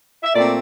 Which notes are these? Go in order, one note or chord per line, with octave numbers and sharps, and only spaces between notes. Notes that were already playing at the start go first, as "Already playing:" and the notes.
E5
A#2 A3 C4 D5